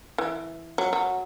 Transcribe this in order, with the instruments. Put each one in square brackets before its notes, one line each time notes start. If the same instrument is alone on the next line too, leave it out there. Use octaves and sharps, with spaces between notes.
[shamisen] E3
F#3
F#3